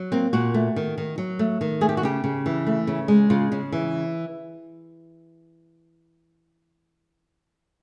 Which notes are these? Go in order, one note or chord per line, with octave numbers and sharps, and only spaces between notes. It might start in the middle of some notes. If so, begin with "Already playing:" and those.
Already playing: F#3
A#3 C4
A#2 F#4
A3
D#3
D#3
F#3
A3
D#3
A3 G#4
G4
F#4
C#3 G4
C#3
E3
A3
C#3
G#3
C#3 F4
C#3
E3